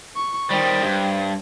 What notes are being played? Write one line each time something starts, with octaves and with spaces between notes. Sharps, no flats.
C#6
D#3 G3 C5 G5
G2